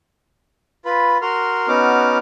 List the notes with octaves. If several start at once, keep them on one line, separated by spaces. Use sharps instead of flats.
F4 B4 B5
F#4 A#4 C6 F6
B3 C#4 D#4 F#4 D6 F6